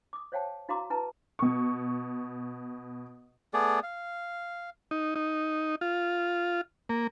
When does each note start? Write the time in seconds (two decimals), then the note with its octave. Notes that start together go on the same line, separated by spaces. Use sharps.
0.13 D6 D#6
0.32 C5 C#5 F5 G5 A5
0.69 E4 F#4 F5 A#5 C6 D6
0.90 E4 B4 A5 A#5
1.39 B2 C#6
3.54 A3 B3 G#4 D5
3.83 F5
4.91 D#4
5.16 D#4
5.81 F4
6.89 A#3